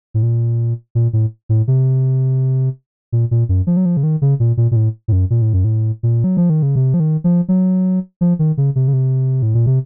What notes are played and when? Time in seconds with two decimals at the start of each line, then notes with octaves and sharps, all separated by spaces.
0.14 A2
0.23 A#2
0.95 A#2
1.13 A2
1.49 A2
1.68 C3
3.12 A#2
3.31 A#2
3.49 F#2
3.67 F3
3.77 F#3
3.85 F3
3.97 C#3
4.03 D#3
4.22 C#3
4.40 A#2
4.57 A#2
4.71 A#2
4.76 A2
5.08 A2
5.12 F#2
5.30 A#2
5.42 A2
5.53 F#2
5.64 A2
6.03 A#2
6.24 F#3
6.37 F3
6.50 D#3
6.63 C#3
6.76 C3
6.94 F3
7.00 D#3
7.24 F3
7.48 F#3
8.21 F3
8.39 D#3
8.57 C#3
8.76 C3
8.88 C#3
8.93 C3
9.42 A2
9.54 A#2
9.66 C3